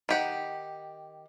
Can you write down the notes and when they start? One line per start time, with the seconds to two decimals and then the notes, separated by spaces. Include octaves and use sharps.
0.09 D#3 G4 F#5